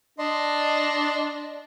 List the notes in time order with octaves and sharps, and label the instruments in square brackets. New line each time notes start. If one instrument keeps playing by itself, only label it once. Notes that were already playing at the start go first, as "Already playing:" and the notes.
[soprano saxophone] D4 [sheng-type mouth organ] D#5 C6